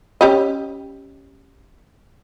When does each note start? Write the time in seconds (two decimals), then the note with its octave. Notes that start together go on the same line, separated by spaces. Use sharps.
0.21 C#4 G4 D#5